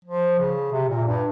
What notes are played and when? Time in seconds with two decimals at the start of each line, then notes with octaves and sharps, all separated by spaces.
0.05 F3
0.39 C#3
0.72 C3
0.89 A#2
1.06 G2